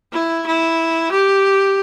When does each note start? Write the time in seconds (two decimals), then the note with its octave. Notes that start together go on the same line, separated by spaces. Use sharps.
0.14 E4
0.47 E4
1.12 G4